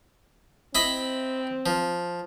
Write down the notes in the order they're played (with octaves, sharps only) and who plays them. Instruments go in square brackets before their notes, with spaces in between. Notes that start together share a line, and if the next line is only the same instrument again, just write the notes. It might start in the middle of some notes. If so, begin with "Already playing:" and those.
[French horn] C4 [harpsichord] E4 D#5 B5
[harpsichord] F3